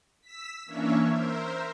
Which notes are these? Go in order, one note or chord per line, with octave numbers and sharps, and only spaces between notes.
E6 B6
E3 A#3 C#4 D4 C#5 E5
A#4 C5 E5